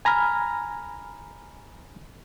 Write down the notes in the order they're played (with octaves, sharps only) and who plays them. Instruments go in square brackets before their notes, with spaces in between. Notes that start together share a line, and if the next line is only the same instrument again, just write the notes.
[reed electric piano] G#5 A#5 B5 F6